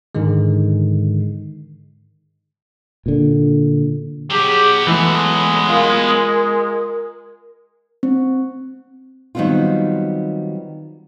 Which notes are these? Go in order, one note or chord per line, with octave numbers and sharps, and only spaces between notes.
G#2 D3 D#3 G#3
A#2 D3
F#3 B3 G4 G#4
E3 G#3 A3
F4 A#4
C4
D#3 F#3 G3 B3 C4 F4